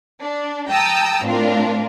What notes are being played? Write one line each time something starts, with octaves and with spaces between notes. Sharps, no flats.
D4
G5 A5 A#5 D#6 E6
A2 C4 D4 F4 A#4